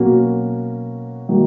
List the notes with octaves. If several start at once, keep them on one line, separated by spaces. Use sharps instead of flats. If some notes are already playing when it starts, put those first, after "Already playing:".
Already playing: B2 F#3 A#3 C#4 F#4
D#3 F#3 A#3 D#4